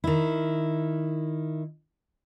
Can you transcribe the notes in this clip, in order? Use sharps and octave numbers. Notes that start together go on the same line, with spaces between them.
D#3 E4